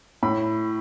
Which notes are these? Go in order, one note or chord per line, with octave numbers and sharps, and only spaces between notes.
A2 B5